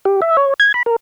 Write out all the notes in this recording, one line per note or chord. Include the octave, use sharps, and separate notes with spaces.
G4
E5
C#5
G#6
B5
A#4